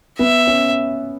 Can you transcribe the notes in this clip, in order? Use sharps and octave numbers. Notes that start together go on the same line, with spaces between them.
B3 E5
C#4